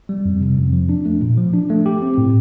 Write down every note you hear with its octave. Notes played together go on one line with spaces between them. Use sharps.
G3
F2
C3
F2
F3
D4
A3
A#2
F3
D4
A3
G4
C4
A2